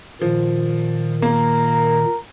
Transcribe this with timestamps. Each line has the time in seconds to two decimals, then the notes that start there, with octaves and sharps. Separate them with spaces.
0.21 A#2 D#3 F3
1.22 A#3 A#4